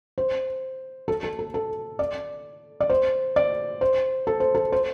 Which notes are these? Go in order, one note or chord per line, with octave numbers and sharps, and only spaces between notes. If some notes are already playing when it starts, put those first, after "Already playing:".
C5
A4
A4
A4
A4
D5
D5
C5
D5
C5
A4
C5
A4
C5